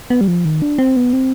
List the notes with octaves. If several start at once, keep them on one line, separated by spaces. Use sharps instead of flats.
B3
G3
F3
D#3
D4
C4
B3
C4